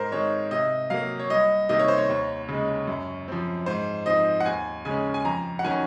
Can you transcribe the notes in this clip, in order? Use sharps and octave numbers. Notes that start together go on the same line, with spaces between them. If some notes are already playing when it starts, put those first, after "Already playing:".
Already playing: G#2 A#4 C5
D#3 G#3 C4 C#5
C3 D#5
F#3 A#3 F5
C#5
C2 D#5
C3 D#3 A#3 D#5
C#5
C5
C#5
D#2
C#3 G#3
F#2
F3 C4
G#2 C5
F3 C4 D#4 D#5
F#5
D#2 G#5
C#3 G#3 C#4 G#5
G#5
F2 A#5
F#5
D#3 F#3 C#4 G#5